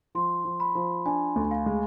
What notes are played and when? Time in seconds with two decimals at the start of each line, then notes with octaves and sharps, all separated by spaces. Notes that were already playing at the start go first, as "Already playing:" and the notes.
0.15 F3 C6
0.45 F3
0.60 B5
0.75 F3
1.06 D4 G#5
1.36 D2
1.51 F5
1.66 G#3